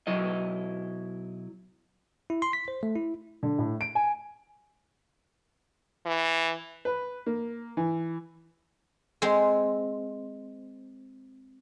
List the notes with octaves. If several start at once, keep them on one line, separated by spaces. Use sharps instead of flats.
B1 F#3 E4 D#5
E4
C6
B6
C5
A3
E4
D3
A2
D7
G#5
E3
B4
A#3
E3
G#3 C4